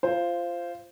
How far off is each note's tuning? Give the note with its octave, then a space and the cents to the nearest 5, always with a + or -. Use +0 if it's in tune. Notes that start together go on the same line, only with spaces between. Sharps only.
F4 -15 C5 +0